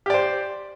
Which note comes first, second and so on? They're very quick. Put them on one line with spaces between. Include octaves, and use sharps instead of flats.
G4 D5 C5